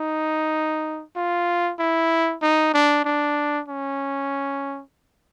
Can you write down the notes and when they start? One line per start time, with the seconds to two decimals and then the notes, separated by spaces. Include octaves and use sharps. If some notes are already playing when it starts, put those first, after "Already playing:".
Already playing: D#4
1.16 F4
1.79 E4
2.42 D#4
2.74 D4
3.05 D4
3.69 C#4